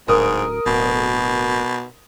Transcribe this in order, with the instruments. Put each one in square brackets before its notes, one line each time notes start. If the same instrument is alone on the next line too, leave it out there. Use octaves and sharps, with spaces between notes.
[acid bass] D1 [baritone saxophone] G#2 [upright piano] A#4 D#6
[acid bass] D1 [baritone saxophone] B2